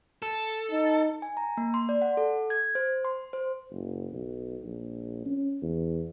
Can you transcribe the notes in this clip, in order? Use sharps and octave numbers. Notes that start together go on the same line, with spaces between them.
A4
D#4
G#5
A#5
A#3
C6
D5
F#5
A4
G#6
C5
C6
C5
F#1
B1
A#1
C#4
E2